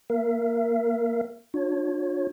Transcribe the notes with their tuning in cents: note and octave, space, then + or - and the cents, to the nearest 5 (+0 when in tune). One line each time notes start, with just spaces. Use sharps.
A#3 +0 A#4 +0 E5 +45
D4 +15 F4 +45 C#5 -10